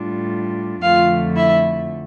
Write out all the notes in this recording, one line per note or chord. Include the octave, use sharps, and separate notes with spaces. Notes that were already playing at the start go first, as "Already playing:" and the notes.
Already playing: A2 G3 D4 F4
F2 D3 F3 A3 F4 F5
E4 E5